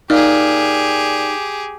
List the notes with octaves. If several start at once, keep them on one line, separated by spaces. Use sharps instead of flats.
A#2 D#4 G4 G#4